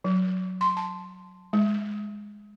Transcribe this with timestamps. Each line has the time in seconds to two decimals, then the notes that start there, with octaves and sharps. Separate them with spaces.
0.04 F#3
0.61 C6
0.77 A5
1.53 G#3